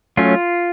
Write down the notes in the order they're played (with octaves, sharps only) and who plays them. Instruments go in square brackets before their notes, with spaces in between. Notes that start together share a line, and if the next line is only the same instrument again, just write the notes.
[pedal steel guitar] F#3 A3 C#4 F4